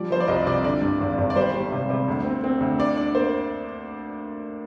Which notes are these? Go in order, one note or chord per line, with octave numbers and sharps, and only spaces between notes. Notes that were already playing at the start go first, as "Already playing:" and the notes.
Already playing: F3 G3 D5
F3 C5
D5
C2 D#5
C3 D5
D3 D5
G2
G#1
G#1
D5
G3 C5
G3
C3
C3
D2
C4
C4
D2
D4 D5
D4 D5
A#3 C5